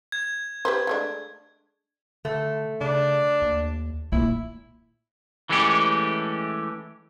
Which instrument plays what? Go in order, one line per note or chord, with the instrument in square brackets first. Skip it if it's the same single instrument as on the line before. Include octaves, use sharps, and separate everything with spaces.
[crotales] G#6
[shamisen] G4 B4 C5
G#3 A3 D4
[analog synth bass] D3 [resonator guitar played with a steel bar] A3
[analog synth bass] C#3 [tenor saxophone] D4
[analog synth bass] D#2
[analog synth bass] A#2 [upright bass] A#3 [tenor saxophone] E4
[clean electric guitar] E3 G#3 A3 C#4 G4